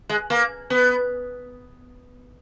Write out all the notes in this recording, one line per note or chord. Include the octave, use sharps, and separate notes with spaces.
G#3
A#3
B3